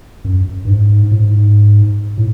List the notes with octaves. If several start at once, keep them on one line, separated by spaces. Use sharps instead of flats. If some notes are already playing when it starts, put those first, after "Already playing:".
F#2
G2
G#2
A2
G#2
A2